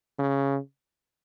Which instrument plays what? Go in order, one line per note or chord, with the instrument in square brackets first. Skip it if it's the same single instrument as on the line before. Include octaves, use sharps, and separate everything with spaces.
[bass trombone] C#3